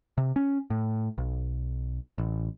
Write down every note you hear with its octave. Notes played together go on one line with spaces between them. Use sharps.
C3
C#4
A2
B1
A1